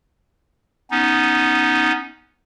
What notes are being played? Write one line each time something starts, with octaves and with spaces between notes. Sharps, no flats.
B3 C#4 D#4